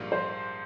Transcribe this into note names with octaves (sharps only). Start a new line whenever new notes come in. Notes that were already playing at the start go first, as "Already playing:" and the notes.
Already playing: A#1 G#2 G3 A#3 F4
C5